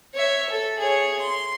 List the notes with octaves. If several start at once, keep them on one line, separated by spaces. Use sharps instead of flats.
C#5 E5
A4
G#4 C#5
C6